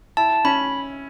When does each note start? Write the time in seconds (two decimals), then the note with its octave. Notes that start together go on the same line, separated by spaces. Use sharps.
0.17 E4 A5
0.45 C#4 B5